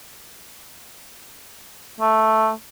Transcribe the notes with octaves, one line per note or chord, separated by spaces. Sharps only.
A3